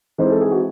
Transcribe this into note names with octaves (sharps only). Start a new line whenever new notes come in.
E3 G#3 C4 D#4 C5
A4
G#4
F#4